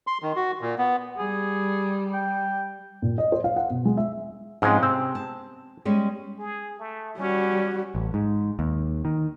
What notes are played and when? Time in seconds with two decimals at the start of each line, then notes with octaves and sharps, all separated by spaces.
0.07 C6
0.22 D#3
0.36 F#4
0.61 A#2
0.78 B3
1.18 G3 G#4
2.13 G5
3.02 A#2
3.18 D#5
3.32 C5
3.44 F5
3.56 F#5
3.70 B2
3.85 G#3
3.97 E5
4.62 G#2 F3 G#3 C4 C#4
4.83 C3 C4
5.15 A5
5.85 G3 G#3 C#4
6.39 G#4
6.80 A3
7.18 G3 C#4 F#4
7.95 A1
8.14 G#2
8.59 D#2
9.05 D#3